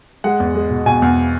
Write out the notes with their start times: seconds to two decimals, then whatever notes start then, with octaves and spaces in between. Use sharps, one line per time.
0.24 G#3 F#5
0.40 E2
0.55 G#3
0.70 B2
0.86 B2 G#5
1.02 E2